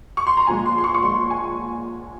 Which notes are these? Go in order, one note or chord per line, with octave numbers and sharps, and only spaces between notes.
C#6
C6
A#5
A#2 F3 G#3 G#5
C6
C6
C#6
C#6
A#2 F3 G#3 C6
G#5